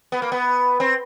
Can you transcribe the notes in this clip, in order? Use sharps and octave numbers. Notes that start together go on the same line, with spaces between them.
B3
A#3
B3
C4